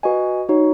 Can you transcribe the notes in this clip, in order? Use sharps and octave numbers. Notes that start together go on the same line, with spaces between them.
F#4 B4 D#5 G#5
D#4 F#4 C#5